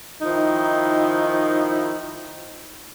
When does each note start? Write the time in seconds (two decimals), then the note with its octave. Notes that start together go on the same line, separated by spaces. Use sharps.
0.22 D#3 F3 D#4 E4